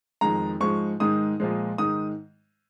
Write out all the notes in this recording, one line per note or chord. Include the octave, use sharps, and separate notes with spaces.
F2 D#3 G#3 A#5
G#2 F3 G#3 C#6
G#2 D#3 G#3 D#6
A#2 F3 G#3
G#2 D#3 G#3 D#6